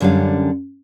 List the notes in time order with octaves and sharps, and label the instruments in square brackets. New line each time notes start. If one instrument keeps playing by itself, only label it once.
[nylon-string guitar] F#2 D3 G3 C#4 F5